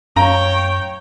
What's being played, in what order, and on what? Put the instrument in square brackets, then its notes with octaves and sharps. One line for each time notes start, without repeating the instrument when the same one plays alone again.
[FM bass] F#2 [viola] C#5 G5 [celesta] F5 [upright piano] A#5